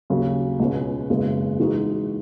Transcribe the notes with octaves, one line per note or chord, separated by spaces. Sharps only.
D#2 C#3 F#3
C#2 B2 G#3 C#4
F#1 E2 C#3 G#3
E3 G#3 D#4 F#4